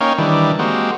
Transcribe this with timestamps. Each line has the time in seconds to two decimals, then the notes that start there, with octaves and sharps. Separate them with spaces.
0.01 A#3 C#4 D#4 C#5 F5 G5
0.18 D#3 E3 G3 D4
0.59 G#3 A#3 C4 F#4 G4